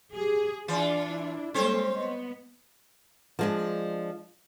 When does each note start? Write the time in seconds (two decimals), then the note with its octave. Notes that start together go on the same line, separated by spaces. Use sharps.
0.15 G4 G#4
0.68 E3 D4 F4 D5
1.09 E4
1.54 G3 G#3 A#3 C4 A4 C5 C#5
1.95 B3 D#5
3.39 F3 G#3 D4